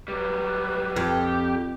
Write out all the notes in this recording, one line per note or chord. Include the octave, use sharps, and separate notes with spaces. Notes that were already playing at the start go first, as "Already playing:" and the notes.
F#3 G3 B4
F2 G4